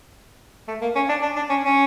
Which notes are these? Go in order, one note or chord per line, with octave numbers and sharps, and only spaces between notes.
A3
A#3
C#4
D4
D4
D4
C#4
C#4